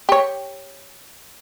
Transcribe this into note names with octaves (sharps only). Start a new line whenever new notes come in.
G4 C#5